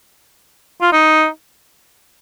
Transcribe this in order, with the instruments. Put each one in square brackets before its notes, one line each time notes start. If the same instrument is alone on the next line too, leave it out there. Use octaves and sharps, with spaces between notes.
[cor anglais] F4
D#4